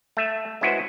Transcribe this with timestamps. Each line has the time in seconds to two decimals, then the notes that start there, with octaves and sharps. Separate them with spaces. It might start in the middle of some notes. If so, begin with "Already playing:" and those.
0.17 A3 E5
0.61 G#3 C#4 E4 F#4 B4 C5